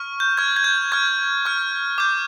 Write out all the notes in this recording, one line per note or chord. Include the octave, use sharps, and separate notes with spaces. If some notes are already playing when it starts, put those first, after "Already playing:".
Already playing: C#6 F6
G6
C#6 F6 G#6
G#6
G6
C#6 F6 G#6
C#6 F6
D6 G6